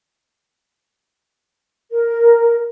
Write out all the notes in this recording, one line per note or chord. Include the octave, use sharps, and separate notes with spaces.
A#4